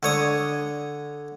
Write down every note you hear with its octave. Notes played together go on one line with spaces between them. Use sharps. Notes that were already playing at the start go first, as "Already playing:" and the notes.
D3 C#5 D#6